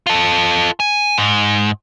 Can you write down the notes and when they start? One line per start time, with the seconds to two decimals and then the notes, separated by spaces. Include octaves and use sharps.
0.07 F4 A4
0.80 G#5
1.18 G#2